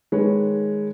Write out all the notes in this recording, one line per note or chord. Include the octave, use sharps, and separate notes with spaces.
D#3 G#3 B4 C#5